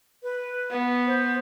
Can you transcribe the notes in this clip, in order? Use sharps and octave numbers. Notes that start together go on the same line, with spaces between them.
B4
B3
C5